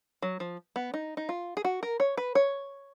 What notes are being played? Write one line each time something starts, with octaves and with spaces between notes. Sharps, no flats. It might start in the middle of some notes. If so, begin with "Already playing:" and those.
F#3
F3
B3
D#4
D#4
F4
G#4
F#4
A#4
C#5
B4
C#5